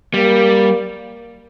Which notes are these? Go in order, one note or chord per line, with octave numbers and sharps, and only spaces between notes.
G3 A#3